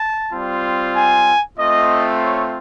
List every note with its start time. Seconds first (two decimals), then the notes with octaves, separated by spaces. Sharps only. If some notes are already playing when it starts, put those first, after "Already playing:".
Already playing: A5
0.32 G3 C4 F4
0.95 G#5
1.58 A3 C4 F4 D#5
2.22 C#5